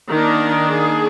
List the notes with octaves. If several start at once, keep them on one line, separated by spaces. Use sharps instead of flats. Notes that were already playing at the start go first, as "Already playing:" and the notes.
D#3 A#3 D4 A#4
G#4